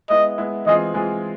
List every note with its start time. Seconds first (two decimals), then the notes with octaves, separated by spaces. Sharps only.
0.09 G#3 B3 E4 D#5
0.38 G#3 B3 E4
0.66 E3 G#3 C4 F4 G#4 D#5
0.94 E3 G#3 C4 F4 G#4